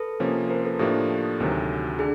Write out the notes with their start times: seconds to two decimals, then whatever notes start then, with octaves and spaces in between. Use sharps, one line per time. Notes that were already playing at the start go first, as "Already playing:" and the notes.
Already playing: A4 B4
0.20 C3 F3 A#3 C#4
0.50 A#4 C5
0.64 A4 B4
0.79 A2 F3 A#3 D4 G4 A4
1.40 D2 C3 D#3 F#3
1.99 D3 G#4